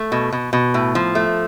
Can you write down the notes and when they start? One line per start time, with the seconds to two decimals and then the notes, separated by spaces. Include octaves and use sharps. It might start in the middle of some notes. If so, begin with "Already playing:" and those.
Already playing: A3
0.12 B2
0.32 B2
0.53 B2
0.74 A2
0.95 F3
1.15 A3